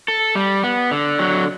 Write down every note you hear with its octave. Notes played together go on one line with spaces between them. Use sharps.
A4
G3
B3
D3
F#3